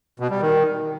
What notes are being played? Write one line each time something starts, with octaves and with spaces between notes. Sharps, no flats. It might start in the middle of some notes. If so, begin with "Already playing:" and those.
B2
G3
D#3